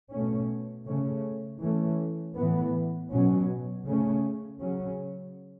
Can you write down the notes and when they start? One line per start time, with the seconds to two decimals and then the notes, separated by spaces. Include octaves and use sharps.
0.12 B2 A3 C#4
0.87 C#3 A3 C#4
1.61 E3 A3 C#4
2.37 A2 E3 B3
3.11 B2 F#3 C#4
3.85 C#3 A3 C#4
4.60 C#3 F#3 C#4